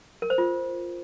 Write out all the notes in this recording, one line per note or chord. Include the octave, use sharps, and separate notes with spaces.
A#4
C5
F4